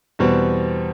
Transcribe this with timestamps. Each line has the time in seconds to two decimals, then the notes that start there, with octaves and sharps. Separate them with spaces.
0.19 E2 B2 G3 C4